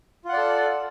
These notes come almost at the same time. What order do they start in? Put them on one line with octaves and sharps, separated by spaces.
F4 F#5 D5 A4